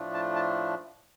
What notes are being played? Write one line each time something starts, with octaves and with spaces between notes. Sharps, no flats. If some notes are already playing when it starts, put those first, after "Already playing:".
Already playing: A2 F3 A3 D4
A5
A5